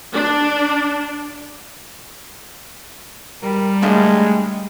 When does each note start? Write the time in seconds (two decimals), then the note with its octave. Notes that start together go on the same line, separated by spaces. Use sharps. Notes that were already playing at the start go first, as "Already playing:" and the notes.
0.14 D4
3.42 G3 A#4
3.82 G#3 A3 D4 F5